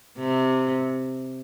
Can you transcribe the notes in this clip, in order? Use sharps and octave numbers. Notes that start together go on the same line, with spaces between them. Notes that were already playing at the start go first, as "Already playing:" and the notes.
C3